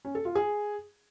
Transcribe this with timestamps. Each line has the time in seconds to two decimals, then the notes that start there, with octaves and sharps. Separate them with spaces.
0.05 C#4
0.15 A4
0.25 F4
0.35 G#4